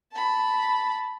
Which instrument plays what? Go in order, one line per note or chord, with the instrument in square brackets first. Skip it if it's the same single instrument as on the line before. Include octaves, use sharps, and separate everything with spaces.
[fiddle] A5 B5